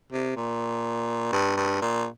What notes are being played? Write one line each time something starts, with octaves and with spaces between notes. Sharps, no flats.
C3
A#2
G2
G2
A#2